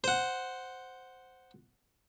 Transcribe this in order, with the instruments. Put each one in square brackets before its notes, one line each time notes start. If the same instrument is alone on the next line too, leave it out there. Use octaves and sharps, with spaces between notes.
[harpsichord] C5 F#5